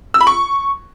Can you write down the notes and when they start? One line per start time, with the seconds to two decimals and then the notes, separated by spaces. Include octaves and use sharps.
0.14 E6
0.21 B5
0.27 C#6